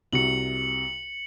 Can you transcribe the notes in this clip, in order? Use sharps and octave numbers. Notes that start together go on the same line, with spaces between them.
C2 C3 F#4 C#7 F#7